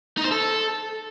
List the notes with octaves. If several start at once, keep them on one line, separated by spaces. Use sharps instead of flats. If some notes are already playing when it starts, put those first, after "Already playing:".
D#4
C5
A4